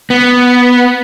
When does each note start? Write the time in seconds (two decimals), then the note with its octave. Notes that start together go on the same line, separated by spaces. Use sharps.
0.10 B3